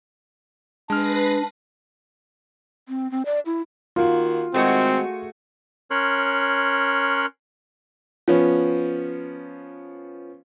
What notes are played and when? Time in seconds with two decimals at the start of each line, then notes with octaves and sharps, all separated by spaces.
0.90 G#3 D4 B4 F6 A#6 C7
2.89 C4
3.11 C4
3.26 D5
3.46 E4
3.96 D#3 A#3 F4 F#4
4.54 D#3 G#3 A3 C4 F#4 G#4
5.91 C#4 A#4 C#5 C6 F#6
8.28 F3 B3 C#4